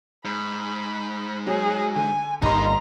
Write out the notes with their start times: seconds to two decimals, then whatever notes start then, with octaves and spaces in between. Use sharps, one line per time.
0.25 G#2 B5
1.47 F#3 G#4
1.95 D3 G#5
2.42 G1 G2 G3 A#3 D#4 D#5 A#5 C6